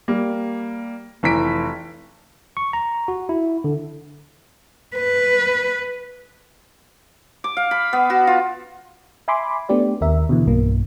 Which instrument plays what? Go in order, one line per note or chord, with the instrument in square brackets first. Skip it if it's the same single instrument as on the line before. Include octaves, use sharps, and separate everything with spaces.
[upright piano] G3 A#3
F1 E3 A#5 B6 D7
[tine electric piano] C#6
A#5
F#4
E4
D3
[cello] B4
[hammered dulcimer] D6
F5
B5
B3
F#4
F4
[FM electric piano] E5 G#5 B5 C6 D6
A3 B3 D4 G4 D5
D#2 A#4 E5
B2 D3 E3
B1 G2 A#3